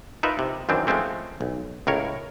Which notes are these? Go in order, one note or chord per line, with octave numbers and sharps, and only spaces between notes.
D#4 F4 A#4 B4 E5
C3
F#2 D#3 E3 C4 D4
F3 G#3 A3 C4 C#4
B1
C#2 A2 A#4 C#5